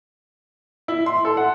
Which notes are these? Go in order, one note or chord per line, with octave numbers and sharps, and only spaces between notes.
E4
C6
A4
F#5